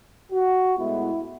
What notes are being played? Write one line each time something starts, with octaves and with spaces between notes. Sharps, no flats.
F#4
A2 G#3 B3 E4